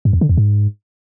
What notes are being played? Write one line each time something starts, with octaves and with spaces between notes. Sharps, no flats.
G2
E2
D3
E2
G#2